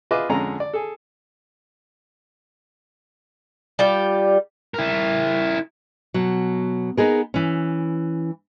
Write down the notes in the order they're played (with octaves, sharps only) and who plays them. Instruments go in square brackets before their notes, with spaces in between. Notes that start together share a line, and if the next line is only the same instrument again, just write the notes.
[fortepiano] F4 G#4 B4 D#5 E5 D6
F2 D3 G#3 C#4 A#5
D5
G#4 A4
[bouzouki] G3 F4 G4 G5
[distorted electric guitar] E4 A#4
[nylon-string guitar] B2 F#3
B3 D#4 G#4 A#4
E3 C#4